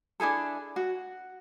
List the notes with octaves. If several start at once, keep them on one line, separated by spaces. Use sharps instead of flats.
D4 E4 G#4 A4
F#4